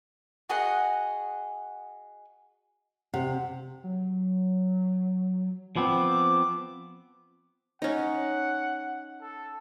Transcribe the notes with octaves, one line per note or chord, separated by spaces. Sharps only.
F#4 G#4 D#5 F#5
C3 F#5
F#3
F3 B3 C4 D6
C#4 D#4 F#5
A4